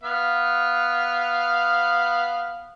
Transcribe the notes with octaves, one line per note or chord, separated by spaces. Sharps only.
B3 F5 F6